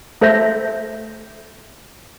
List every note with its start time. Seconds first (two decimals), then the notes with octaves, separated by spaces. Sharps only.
0.21 A3 A4 C5 E5 G6 A#6